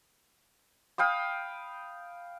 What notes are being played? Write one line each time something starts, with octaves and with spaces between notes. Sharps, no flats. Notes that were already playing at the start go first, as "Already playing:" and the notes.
F5 G5 B5 D#6